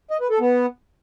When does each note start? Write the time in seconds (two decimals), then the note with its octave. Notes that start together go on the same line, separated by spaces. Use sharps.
0.11 D#5
0.20 B4
0.30 A4
0.40 B3